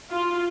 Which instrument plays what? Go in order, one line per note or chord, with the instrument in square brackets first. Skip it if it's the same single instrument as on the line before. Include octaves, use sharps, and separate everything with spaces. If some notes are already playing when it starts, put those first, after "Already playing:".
[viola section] F4